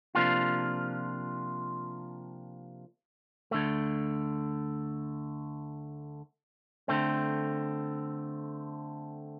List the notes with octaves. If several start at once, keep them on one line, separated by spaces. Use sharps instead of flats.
C3 F3 A#3 D4 F4
D2 D3 A3
D3 A3 C4